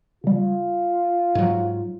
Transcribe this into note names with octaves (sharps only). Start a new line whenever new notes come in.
C#3 G3 F4
G#2 F#3